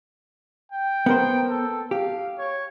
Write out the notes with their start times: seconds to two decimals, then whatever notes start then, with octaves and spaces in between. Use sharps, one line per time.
0.72 G5
1.06 B3 A#4 C5
1.49 A4
1.91 G4 F5
2.38 C#5